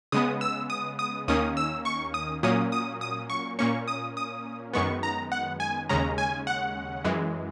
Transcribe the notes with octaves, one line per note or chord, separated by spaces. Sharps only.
C#3 G#3 B3 D#6
E6
D#6
D#6
D#2 D#3 A#3 C#4 D#6
E6
C#6
D#6
A#2 F#3 A#3 C#4 D#6
D#6
D#6
C#6
A#2 A#3 C#4 C#6
D#6
D#6
F#2 D#3 G#3 B3 C#6
A#5
F#5
G#5
D#2 C#3 G#3 C#4 A#5
G#5
F#5
F#2 E3 G#3